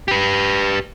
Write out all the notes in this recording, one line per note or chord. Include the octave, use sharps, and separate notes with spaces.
G4 B4